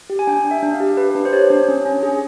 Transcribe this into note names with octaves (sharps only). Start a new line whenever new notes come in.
G4
G#5
D4 G5
D4
E5
D4
F5
G4
G4 B4
D4
C5
G4 C#5
D4
C#4
C#4
G#4